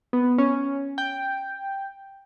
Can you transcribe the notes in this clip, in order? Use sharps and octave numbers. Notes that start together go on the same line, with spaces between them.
B3
C#4
G5